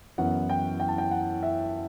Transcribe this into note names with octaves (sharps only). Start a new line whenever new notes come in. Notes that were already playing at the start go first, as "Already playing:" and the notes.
F#2 E3 B3 F#5
G5
G5
A5
G5
F#5
E5